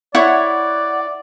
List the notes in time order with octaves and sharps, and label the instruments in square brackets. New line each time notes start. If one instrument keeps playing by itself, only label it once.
[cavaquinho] E4 C#5 [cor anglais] D5 [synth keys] F#5